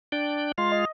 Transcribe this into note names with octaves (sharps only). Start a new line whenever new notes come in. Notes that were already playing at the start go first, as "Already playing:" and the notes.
D4 D5 G5
G#3 F4 F5 C6
D#5